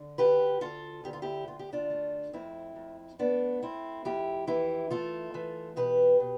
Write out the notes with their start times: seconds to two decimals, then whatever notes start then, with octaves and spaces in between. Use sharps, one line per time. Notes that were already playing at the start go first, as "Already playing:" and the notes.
Already playing: D3
0.18 D2 G4 B4
0.61 D2 F4 A4
1.04 D2 G4
1.13 F4
1.22 E4 G4
1.47 D2 F4
1.59 G4
1.73 D4 F4
1.90 A3
2.33 F2 C4 E4
2.76 F2
3.19 A3 B3 D4
3.62 A3 C4 E4
4.05 F2 E4 G4
4.47 E3 E4 G4
4.90 A3 F4 A4
5.34 E3
5.76 B2 G4 B4
6.20 B2